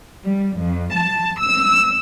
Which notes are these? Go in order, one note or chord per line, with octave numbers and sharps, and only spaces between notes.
G3
F2
A5
E6